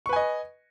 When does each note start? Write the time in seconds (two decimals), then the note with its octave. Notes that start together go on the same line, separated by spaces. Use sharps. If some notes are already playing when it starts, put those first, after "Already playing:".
0.06 C#6
0.09 B4
0.13 G#5
0.16 D#5